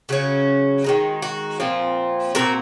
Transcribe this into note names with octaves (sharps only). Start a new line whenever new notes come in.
C#3 F#3 C#4 F#4
D#3 G#3 D#4
F#4
A#2 F3 C4
A#2 F#3 C4 F#4 A#4